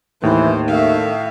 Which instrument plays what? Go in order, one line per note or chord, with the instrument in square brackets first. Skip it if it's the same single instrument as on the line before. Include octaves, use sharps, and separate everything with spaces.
[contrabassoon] D#2 [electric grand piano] A2 [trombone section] E3 [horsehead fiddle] C5
[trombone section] D#3 A3 [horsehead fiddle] E5 F5